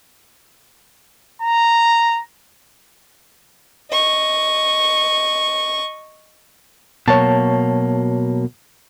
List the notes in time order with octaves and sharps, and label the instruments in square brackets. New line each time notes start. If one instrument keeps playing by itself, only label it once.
[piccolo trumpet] A#5
[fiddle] D#5 C#6
[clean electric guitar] B2 F#3 A#3 [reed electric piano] C#5 A5